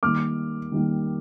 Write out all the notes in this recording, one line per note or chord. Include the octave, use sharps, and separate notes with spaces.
D#3 G3 A#3 D6 F6
D#3 G3 A#3